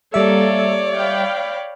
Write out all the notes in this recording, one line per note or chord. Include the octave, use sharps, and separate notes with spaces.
G3 A#3 A4 C#5 D5 E5
F5 G5 B5